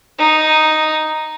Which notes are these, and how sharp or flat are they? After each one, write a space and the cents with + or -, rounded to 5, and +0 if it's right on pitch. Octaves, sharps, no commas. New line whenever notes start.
D#4 +0